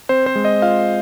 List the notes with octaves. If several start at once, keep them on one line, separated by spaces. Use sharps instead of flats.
C4 C5
C5
G#3
D#5
F4 F5